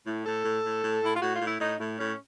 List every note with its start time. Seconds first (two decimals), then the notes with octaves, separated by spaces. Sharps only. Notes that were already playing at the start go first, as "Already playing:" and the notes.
0.06 A2
0.25 A2 A4
0.44 A2
0.65 A2
0.83 A2
1.03 A2 E4
1.14 F4
1.21 A2 F#4
1.35 F4
1.41 A2
1.47 E4
1.60 A2 D#4
1.79 A2
1.98 A2 C#4